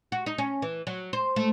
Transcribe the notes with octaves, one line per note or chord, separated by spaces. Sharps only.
F#4
D#4
C#4
E3
F#3
C5
A3